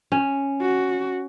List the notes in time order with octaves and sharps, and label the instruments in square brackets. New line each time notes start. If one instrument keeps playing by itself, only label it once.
[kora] C#4
[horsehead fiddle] F#4